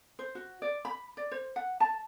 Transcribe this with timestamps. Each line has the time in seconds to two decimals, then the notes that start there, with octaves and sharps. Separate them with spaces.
0.19 C5
0.35 F#4
0.62 D5
0.85 B5
1.17 D5
1.32 C5
1.56 F#5
1.80 A5